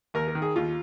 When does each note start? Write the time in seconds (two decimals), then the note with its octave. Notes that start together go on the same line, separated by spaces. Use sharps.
0.14 D#2 A#4
0.28 A#4
0.35 D#3
0.42 G#4
0.56 D#2 F4